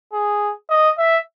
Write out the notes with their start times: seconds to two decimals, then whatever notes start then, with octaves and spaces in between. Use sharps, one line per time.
0.13 G#4
0.70 D#5
0.98 E5